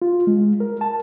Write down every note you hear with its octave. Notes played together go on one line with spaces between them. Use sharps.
F4
G#3
A#4
A5